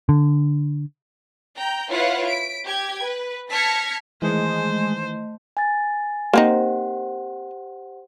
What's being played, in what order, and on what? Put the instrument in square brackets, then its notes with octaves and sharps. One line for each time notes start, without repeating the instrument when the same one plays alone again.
[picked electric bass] D3
[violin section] G5 A#5 G6
E4 F4 B4 C#5 F5 F#5
B6 D7
G4 G5 G#6
B4
A5 F6 G#6 A#6 B6 C#7
[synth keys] D#3 E3 [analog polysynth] G#3 [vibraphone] A3 D#5 [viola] C5
[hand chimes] G#5 A6
[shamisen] A#3 C4 D#4 [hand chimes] G4 C5 F#5